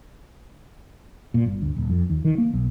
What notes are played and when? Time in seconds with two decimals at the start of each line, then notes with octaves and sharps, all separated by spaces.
1.34 A#2
1.46 G1
1.62 D2
1.76 D#1
1.89 F2
2.10 D#2
2.25 D#3
2.38 A#3
2.53 B1